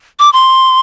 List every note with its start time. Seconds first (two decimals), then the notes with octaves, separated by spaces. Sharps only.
0.19 D6
0.33 C6